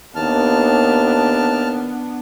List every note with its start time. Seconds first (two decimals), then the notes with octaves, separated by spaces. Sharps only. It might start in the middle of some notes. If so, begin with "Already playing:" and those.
0.15 D#2 B3 D4 A5 F6